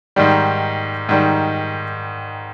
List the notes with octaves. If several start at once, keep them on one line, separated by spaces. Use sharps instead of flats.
G#2 D#3 G3
G#2 D#3 G3